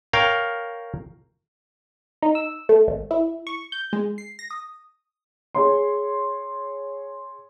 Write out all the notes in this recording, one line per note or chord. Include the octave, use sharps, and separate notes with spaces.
A#4 C#5 F5 G5
D#4
E6
A3
G#1
E4
C#6
G6
G#3
C7
A#6
D#6
G#4 C#5 C6